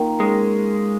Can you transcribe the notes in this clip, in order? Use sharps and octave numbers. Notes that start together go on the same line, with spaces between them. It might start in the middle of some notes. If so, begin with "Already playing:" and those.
Already playing: D#3 A#3 F4
G#3 C#4